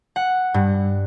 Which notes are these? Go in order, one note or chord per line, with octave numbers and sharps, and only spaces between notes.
F#5
G2